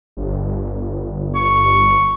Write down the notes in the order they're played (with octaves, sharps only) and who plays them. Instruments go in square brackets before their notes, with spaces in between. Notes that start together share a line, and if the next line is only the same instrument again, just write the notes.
[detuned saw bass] G1
[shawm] C#6